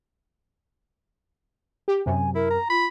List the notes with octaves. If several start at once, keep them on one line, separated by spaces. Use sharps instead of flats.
G4
F#2 C3 G#5
E4 A#4
A#5
F4 B5